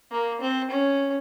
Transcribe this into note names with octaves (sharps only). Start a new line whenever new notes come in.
A#3
C4
C#4